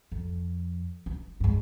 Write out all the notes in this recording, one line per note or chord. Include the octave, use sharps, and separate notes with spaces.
F2
D#4
G2 G#3